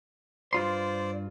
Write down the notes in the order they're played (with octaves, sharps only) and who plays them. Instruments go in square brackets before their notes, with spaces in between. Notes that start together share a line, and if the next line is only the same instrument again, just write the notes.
[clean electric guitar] G2 F4 C6 [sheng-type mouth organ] C5 D5